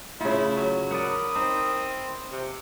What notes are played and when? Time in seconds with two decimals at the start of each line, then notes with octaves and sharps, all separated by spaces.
0.21 C#3 A3 E4 F4
0.56 F#3
0.91 A#4 D5 F#5 B5 D#6
1.36 C4 D#4
2.32 C3